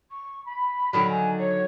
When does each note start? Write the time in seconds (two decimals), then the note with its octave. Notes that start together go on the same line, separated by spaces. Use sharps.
0.10 C#6
0.45 B5
0.93 D3 D#3 F#3
1.08 G#5
1.38 C#5